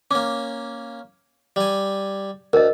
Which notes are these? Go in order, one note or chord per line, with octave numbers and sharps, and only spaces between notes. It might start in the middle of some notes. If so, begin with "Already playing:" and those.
A#3 C#4 D6
G3 G#5
D2 A#4 D#5